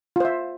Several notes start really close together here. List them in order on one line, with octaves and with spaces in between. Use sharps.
F4 C5 E5